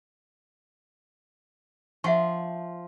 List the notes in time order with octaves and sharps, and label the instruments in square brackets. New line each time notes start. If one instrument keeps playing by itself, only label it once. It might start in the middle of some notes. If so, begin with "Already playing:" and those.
[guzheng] F3 [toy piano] E5 F#5 C#6